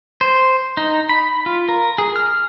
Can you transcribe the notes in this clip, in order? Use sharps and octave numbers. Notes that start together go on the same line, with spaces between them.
C5
D#4
B5
F4
A#4
G#4
F6